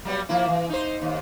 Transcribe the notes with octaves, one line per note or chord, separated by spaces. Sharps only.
F#3 G3 B3
F3 A#3 E4
E3
D#4 C5
D#2